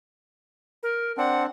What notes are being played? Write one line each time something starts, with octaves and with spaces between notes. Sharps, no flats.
A#4
C4 D4 F#5